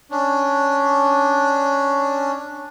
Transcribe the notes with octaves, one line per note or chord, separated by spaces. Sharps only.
C#4 D4